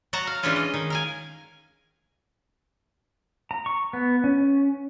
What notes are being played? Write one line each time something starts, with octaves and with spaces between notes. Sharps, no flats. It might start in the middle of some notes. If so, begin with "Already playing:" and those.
F#3 F#4 A5 A#5
F5
E3 G#3 C#4 D4 F4 C#5
D#5
D#3
A#4 F5 G#5
A#5
C#6
B3
C#4